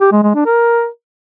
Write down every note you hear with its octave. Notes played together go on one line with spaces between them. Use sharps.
G4
G#3
G#3
D4
A#4